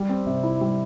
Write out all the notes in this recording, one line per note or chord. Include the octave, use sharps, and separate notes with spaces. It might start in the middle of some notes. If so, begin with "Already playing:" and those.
Already playing: G3
C4
C3
E4
G3